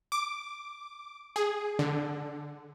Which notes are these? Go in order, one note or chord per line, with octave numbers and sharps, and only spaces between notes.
D6
G#4
D3